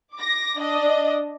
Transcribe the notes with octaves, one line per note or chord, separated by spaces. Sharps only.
D6 A#6
D4 D#5